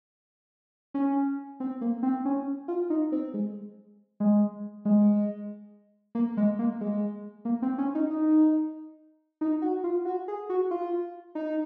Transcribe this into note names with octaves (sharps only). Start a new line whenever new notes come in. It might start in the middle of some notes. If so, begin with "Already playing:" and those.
C#4
C4
A#3
C4
C#4
F4
D#4
C4
G#3
G#3
G#3
A#3
G#3
A#3
G#3
A#3
C4
C#4
D#4
D#4
D#4
F#4
F4
F#4
G#4
F#4
F4
D#4